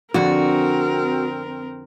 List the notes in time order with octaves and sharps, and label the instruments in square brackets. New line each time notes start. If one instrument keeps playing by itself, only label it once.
[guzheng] F2 D3 [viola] C4 A#4 [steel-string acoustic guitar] F#4